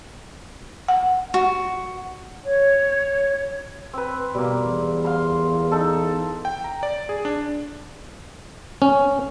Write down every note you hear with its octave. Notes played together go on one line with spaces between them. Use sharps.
F#5
F#4
C#5
C4 B4
B2 G3 A#3
E2
F5 C6
D#4 A4
G5
A#5
D5
G#4
D4
C#4